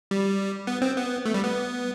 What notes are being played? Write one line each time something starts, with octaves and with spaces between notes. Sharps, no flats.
G3
B3
C4
B3
A3
G3
B3